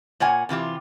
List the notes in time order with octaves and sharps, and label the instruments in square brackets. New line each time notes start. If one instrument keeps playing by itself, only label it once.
[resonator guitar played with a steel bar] A#2 C#5 F#5 G#5
C3 E3 F4 G4